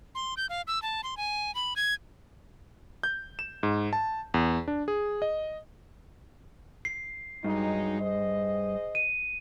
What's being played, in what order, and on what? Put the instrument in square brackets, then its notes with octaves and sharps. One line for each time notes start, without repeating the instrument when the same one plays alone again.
[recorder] C6
G6
F5
E6
A5
C6
G#5
B5
G#6
[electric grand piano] G6
E7
G#2
A5
E2
D4
G#4
D#5
[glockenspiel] C7
[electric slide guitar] G2 [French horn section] F#3 G#3 D#4
[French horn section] G#4 C5 D#5
[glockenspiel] D#7